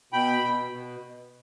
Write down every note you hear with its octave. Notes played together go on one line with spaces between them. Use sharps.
B2 G5 B5
B2
B2